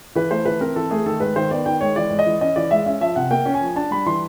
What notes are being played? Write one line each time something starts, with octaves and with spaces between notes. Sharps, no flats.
E3 B4
A3 C5
E3 B4
C4 A#4
E3 A4
A3 G#4
D#3 A4
G#3 B4
D#3 C5
B3 D5
D#3 G5
G#3 C#5
E3 D5
G#3
D#5
E3
C#4 D#5
E3 D5
G#3 E5
C#4 E5
F3 E5
C3 F#5
A#3 G5
C#4
G#5
F3
D4 A5
G3 B5
E3 C6